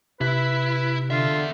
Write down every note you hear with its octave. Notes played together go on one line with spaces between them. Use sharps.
C3 E4 B4
E2 D3 F4 E5